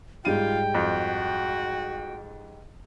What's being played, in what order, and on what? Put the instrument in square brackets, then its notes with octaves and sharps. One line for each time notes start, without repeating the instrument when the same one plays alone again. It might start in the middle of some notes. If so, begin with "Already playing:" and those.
[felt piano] G#2 G3 D#7 [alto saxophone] F4 [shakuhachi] G5
[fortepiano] F2 [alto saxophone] F#4